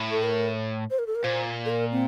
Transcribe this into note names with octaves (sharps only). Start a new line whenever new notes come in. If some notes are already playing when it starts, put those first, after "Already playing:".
Already playing: A2
A4
A#4
C5
A#4
A4
A#4
A#2 C5
A4
A#4
C4